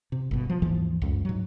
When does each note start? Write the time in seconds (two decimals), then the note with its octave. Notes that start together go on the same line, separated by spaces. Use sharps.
0.12 C3
0.31 G1 B2
0.50 F3
0.62 D#2 G#2 E3 F3
1.02 C#2 F#2
1.25 G#2 F#3